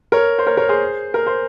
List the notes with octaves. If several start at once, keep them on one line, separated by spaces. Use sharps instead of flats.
A#4 C#5
C5
A#4 C#5
A#4 C#5
G#4 C5
A#4
C5